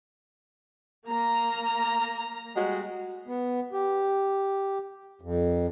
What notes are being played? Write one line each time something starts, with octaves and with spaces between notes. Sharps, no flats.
A#3 A#5
G3 G#3 F#4
B3
G4
F2